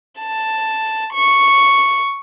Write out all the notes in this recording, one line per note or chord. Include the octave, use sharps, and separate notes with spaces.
A5
C#6